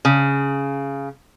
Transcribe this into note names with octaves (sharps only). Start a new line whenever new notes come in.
C#3